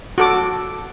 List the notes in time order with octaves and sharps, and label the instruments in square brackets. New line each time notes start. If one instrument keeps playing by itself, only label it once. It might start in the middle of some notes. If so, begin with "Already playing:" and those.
[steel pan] F#4 A4 D6